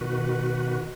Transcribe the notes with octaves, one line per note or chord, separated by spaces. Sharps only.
B2 D#3 F#4 B4